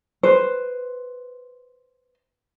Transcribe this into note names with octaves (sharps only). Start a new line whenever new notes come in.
B4 C5